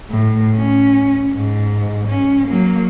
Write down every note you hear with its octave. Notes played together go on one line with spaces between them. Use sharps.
A2
C#4
G#2
C#4
F#3 A#3